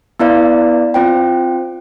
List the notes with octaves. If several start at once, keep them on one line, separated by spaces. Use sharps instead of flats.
B3 E4 B4 D5 F5
C4 F4 C5 G5